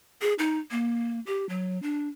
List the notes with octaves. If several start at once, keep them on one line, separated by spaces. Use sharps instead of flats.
G#4
D#4
A#3
G4
F#3
D4